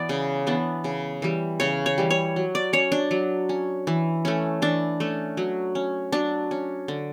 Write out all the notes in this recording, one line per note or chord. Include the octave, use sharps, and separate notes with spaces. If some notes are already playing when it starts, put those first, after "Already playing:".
Already playing: E3 B3 D5
C#3
E3 B3 D4
C#3
E3 G3
C#3 C#5
C#5
E3 G3
C#5
F#3
D5
C#4 C#5
D4
F#3
C#4
E3
A3 C#4
E3 D4
A3 C#4
F#3
C#4
F#3 D4
C#4
D3